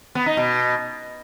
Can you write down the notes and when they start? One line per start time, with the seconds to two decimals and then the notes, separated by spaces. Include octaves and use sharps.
0.15 B3
0.26 D#4
0.37 B2